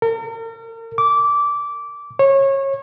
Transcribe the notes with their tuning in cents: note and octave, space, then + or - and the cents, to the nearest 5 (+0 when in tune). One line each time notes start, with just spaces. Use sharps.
A#4 -40
D6 -15
C#5 -25